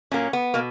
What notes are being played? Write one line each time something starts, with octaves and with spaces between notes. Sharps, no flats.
A#2 F#3 A#3 C#4
B3
B2 A#3